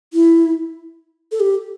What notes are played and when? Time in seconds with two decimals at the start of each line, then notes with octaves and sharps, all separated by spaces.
0.13 E4
1.32 A4
1.40 G4